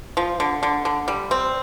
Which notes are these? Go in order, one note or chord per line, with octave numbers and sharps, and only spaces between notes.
F3
D3
D3
D3
G3
C4